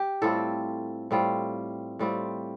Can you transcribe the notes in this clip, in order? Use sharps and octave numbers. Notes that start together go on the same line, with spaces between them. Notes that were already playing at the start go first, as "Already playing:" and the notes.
Already playing: G4
A2 G3 C4 F4 A4
A2 G3 C4 F4
A2 G3 C4 F4